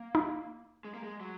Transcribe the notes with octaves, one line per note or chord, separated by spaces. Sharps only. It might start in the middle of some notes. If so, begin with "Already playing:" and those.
Already playing: A#3
D#4
G#3
A#3
G#3
F#3